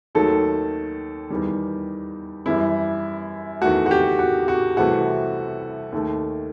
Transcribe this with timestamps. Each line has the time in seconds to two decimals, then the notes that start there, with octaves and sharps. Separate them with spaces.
0.15 D#2 D#3 F#3 A3 A4
1.30 E2 D#3 G3
2.46 F#2 E3 G3 E4
3.61 E2 D#3 A3 F#4
3.86 F#4
3.91 G4
4.19 F#4
4.48 F#4
4.77 C2 C3 E3 A3 F#4
5.92 D#2 D#3 A3